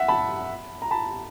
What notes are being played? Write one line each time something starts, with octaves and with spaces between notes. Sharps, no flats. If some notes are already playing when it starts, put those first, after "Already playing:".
Already playing: E5 F#5
A5 B5
A#5
A5 B5